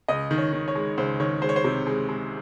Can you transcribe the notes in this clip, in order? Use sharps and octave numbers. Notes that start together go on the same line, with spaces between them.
C#2 D#5
D#3
C#5
D#3
C#5
G#3
C#2 C5
D#3 C#5
G#3 C5
C#5
C5
C3
G#3
G#3